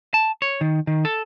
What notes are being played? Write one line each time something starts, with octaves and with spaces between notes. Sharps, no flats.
A5
C#5
D#3
D#3
A4